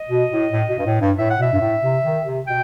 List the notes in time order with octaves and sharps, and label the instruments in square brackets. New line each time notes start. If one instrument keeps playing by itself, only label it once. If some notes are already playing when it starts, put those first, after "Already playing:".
Already playing: [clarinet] D#5
[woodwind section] B2
A2
A2
B2
G2
A2
G2
[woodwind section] A2 [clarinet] E5
[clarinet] F#5
[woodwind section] B2 [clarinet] E5
[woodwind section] G2
A2
C3
D#3
C3
[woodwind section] B2 [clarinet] G5